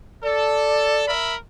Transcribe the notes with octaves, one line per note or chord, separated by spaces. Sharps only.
A4 D5
A#4 E5 B5